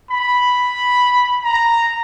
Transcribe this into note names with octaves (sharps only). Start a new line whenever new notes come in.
B5
A#5